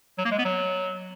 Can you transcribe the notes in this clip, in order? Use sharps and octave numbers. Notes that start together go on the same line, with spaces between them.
F#3
A#3
G#3
B3
F#3